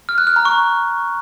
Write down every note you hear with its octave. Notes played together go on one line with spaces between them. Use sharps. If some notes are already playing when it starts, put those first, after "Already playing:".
F6
F#6
F6
A#5
C#6